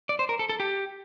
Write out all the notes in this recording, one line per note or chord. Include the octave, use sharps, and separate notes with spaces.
D5
C5
A#4
A4
A4
G4